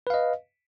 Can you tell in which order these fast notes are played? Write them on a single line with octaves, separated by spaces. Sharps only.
B4 F5 D#5